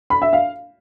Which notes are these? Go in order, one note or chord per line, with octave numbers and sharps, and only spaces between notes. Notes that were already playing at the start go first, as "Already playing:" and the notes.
B5
E5
F5